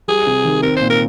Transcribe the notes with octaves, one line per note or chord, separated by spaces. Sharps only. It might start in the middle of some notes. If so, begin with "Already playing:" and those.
G3 G#4
C3
D#3
C4 A#4
A#2 C5
A#4